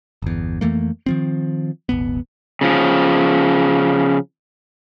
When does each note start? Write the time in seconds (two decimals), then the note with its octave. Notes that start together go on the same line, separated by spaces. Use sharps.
0.22 G1 E2
0.61 F2 E3 A3 A#3
1.06 D#3 F3 C4
1.89 D#1 G#1 B3
2.61 C#3 F3